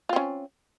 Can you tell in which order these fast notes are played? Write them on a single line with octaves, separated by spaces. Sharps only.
F4 C4 C#4